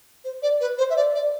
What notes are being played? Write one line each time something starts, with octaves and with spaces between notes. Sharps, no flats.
C5
D5
B4
C5
E5
D5
D5